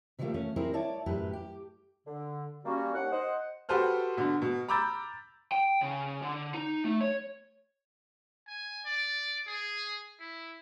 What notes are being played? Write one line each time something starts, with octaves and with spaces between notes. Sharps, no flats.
C#3 E3 F3 G3 A3 A#3
F3 A3 C#4
G3 C4 E4 G#4 A#4 C5
E4 C#5 D5 A5
F#2 A2 G4 B4
G4
D3
G3 A#3 C#4 F#4
D#2 F#5
C5 D#5 F#5
F#4 G4 A4 B4 C5 F6
B2 D3
B2
A#5 B5 D6 E6 G6 A6
G5
C#3
D3
D#4
A3
C#5
G#5
D5
G#4
E4